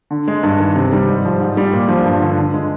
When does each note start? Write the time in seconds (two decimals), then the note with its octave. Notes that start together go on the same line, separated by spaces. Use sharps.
0.11 D3
0.28 G#3
0.43 G2
0.60 D#3
0.76 C3
0.92 G3
1.08 G#2
1.25 F3
1.40 G#2
1.57 G3
1.73 A#2
1.89 F3
2.05 G2
2.22 D3
2.38 D3
2.53 G#3